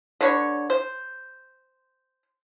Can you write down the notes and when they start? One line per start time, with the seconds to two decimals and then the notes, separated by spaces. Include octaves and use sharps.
0.21 D3 B4 C#5
0.70 C5